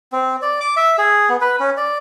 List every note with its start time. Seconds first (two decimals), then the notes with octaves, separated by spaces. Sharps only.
0.12 C4
0.42 D5
0.60 D6
0.77 E5
0.98 G#4
1.29 B3
1.41 B4
1.60 C#4
1.77 D5